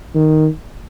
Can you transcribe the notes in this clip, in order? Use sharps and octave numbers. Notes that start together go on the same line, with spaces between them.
D#3